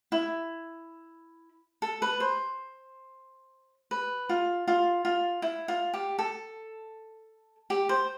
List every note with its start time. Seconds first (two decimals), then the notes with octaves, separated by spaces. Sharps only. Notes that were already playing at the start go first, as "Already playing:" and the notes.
0.12 E4
1.82 A4
2.02 B4
2.20 C5
3.91 B4
4.29 F4
4.68 F4
5.05 F4
5.42 E4
5.68 F4
5.94 G4
6.19 A4
7.70 G4
7.89 C5